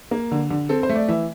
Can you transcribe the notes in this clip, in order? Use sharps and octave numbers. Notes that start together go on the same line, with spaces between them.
A#3
D3
D3
C4 A4
C5
A3
D5
E3 E5